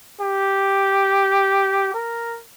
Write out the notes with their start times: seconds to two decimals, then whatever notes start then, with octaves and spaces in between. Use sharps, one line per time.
0.20 G4
1.94 A#4